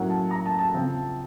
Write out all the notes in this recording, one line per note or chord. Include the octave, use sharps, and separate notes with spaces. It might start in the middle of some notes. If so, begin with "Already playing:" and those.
Already playing: A2 F#3 A#3 C#4 F#5
A5
A#5
A5
A5
C#3 F3 C4